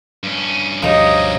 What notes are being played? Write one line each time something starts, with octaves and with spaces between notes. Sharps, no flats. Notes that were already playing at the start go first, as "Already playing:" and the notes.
G2 C#4
D2 B2 F3 D#4 G4 C#5 D#5